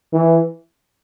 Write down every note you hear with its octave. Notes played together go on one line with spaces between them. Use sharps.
E3